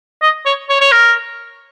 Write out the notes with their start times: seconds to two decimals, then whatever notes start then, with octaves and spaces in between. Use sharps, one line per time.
0.22 D#5
0.46 C#5
0.69 C#5
0.81 C#5
0.92 A#4